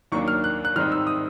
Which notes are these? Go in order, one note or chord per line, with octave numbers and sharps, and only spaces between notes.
D#2 D#3 F#3 A#3 D4 C#6
F6
F#6
F#6
G#2 D#3 G3 C4 D#4 F6
E6
D#6